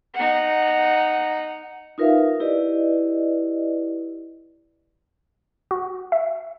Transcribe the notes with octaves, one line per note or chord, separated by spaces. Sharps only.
D#4 F#5
D#4 F4 A#4 B4 E5 F5
E4 G4 B4 D5 D#5
F#4
E5